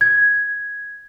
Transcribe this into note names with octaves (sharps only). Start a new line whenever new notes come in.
G#6